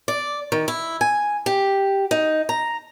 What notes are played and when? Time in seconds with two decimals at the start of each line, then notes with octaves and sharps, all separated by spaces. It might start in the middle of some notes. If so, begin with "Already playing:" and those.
0.08 D5
0.52 D#3
0.68 E4
1.01 G#5
1.46 G4
2.11 D#4
2.49 A#5